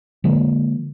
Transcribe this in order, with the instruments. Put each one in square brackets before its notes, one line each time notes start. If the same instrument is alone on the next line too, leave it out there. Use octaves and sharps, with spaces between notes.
[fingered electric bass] D3 F3 G#3 A#3